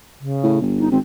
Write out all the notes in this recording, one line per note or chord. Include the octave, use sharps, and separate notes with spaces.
C#3
A2
G1
D#4
G#1 C4